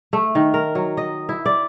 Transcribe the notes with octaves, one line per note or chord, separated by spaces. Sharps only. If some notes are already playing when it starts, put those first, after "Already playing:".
A3
D#3
A#4
F#3
D#5
E4
D5